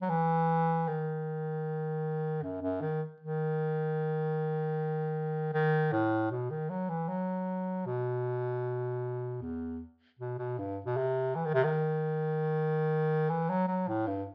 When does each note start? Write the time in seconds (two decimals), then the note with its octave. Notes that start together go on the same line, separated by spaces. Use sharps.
0.02 F#3
0.09 E3
0.87 D#3
2.43 F#2
2.62 F#2
2.81 D#3
3.20 D#3
5.53 D#3
5.92 A2
6.31 B2
6.50 D#3
6.70 F#3
6.89 E3
7.08 F#3
7.86 B2
9.41 E2
10.19 B2
10.38 B2
10.58 G2
10.86 B2
10.97 C3
11.35 E3
11.45 D#3
11.54 C3
11.64 D#3
13.30 E3
13.49 F#3
13.68 F#3
13.88 A2
14.07 G2